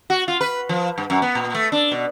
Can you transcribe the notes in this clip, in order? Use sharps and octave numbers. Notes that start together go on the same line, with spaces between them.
F#4
F4
B4
F3
G2
F#2
B3
A#2
A3
D4
B2